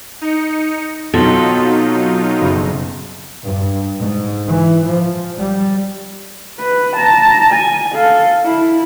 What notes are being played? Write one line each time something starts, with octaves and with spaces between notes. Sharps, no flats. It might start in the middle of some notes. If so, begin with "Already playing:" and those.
D#4 C#7
B2 F#3 C4 D#4 F4 A4
F#1
G2
G#2
E3
F3
G3
B4
A5 A#5
G#5
A4 F5
E4